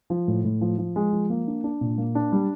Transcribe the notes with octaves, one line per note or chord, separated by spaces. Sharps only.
F3
A2
A2
F3
F3
G#3
F3
A#3
D4
D4
A#2
A#3
D4
G3